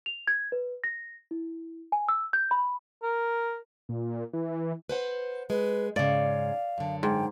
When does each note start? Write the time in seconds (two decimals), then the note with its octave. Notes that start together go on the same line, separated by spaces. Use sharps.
0.06 F7
0.27 G#6
0.52 B4
0.84 A#6
1.31 E4
1.92 G#5
2.08 E6
2.33 G6
2.51 B5
3.03 A#4
3.89 A#2
4.33 E3
4.89 B4 C5 F#5
5.50 G#3 B4
5.96 G#2 C#3 D5 F5
6.78 F#2 D3
7.03 G#2 G5